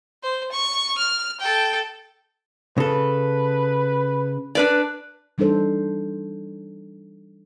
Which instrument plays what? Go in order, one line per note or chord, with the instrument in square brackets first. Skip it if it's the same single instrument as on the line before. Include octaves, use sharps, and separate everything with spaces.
[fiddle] C5
C#6
F6
A4 G5
[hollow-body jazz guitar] C#3 A4 [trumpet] B4
[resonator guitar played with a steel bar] D4 B4 D5
[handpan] E3 G3 D4 D#4 A4 C5